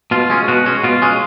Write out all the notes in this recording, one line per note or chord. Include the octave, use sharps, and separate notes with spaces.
B2 F4
G#3 C#4
B2 F#4
G#3 C#4
B2 F4
G#3 C#4